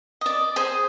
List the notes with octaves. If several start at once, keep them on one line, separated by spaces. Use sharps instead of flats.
D5 D#5
G#4 C5